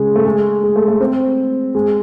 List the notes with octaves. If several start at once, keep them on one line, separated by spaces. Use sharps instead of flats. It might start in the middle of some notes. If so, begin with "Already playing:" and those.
Already playing: C#3 G#3
A3
G#3
G#3
A3
A3
C4
G#3